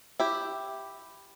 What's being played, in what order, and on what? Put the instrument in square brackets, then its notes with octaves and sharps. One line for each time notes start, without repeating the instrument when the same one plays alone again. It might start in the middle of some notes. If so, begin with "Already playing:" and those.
[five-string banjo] E4 G4